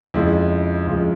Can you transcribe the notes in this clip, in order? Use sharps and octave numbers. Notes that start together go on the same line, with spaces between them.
F2 C#3 F3 G#3 E4
F2 C#3 F3 G#3 F4